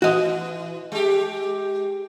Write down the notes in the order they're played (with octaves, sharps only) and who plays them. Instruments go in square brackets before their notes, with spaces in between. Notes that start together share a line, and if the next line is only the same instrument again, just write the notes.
[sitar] E3 [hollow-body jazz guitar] F#4 D#5
[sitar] G#3 G4